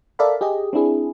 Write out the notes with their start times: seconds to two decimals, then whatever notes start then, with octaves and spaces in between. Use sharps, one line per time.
0.19 A4 A#4 D5 E5 F5 B5
0.41 G4 G#4 D#5
0.73 C4 D4 E4 G#4